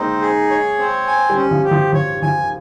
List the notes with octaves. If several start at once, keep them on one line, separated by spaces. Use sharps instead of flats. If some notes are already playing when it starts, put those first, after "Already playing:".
Already playing: G#3 A#3 C4 D#4
G#4
C#5
C4
G#5
G3
C#4
F3
G4
F3
F3 C#5
F3 G#5